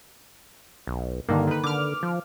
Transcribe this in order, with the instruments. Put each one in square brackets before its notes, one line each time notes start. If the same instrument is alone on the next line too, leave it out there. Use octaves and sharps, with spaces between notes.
[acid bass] B1
[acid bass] G2 [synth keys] D3 D#3 A#3
[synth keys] D#3 B4
[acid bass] D3 [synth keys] D6 F6
[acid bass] F3